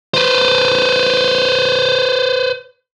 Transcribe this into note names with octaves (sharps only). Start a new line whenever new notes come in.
B4 C5